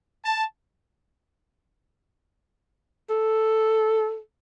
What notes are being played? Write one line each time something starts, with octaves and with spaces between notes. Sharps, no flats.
A5
A4